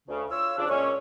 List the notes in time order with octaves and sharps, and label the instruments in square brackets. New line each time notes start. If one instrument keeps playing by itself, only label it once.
[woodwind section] D2 C#3
F4 C#5 E6
C#3 F3 D4
[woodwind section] A#2 G#3 C#4 [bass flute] C#5